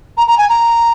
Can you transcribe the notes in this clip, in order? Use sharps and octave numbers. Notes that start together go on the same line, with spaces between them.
A#5
A#5
G#5
A#5